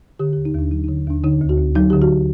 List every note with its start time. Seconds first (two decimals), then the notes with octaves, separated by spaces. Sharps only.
0.19 D3 G4
0.33 D#2 G4
0.45 D#4
0.54 D#2 D4
0.71 F#3 D#4
0.84 D3 D#4
1.07 D#2 D4
1.24 D3 D#4
1.41 D2
1.49 F#4
1.57 D2
1.75 F#3 D#4
1.90 D3 G4
2.02 F#4